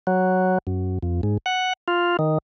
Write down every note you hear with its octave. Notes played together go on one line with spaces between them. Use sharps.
F#3
F#2
F2
G#2
F#5
F4
D#3